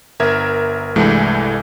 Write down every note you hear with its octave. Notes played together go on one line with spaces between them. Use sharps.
G1 A#4 E5 G#6
C2 G2 E3 G#3 A3